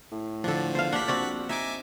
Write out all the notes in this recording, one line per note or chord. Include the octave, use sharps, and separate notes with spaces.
A2
D3 F3 D4 A4
E2 C5 F5
A#1 D4 G4 F#5 B6
C4 F#4 D5
D#4 E5 G#5 D6